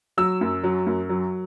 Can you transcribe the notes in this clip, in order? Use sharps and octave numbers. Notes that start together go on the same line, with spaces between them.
F#3 E6
F#2
F#3
F#2
F#3